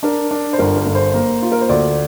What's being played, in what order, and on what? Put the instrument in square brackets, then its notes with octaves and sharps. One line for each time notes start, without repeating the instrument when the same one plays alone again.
[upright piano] D4 A#4
D4
C5
G1 A#4
A#4
G1
C5
A#3
F4
A#4
C5
D2 D5